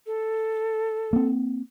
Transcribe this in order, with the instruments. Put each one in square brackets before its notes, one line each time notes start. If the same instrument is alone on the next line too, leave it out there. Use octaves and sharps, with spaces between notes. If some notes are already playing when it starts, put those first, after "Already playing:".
[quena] A4
[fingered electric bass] A#3 C4